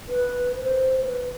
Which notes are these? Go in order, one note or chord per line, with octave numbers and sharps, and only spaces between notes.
B4
C5
C5
B4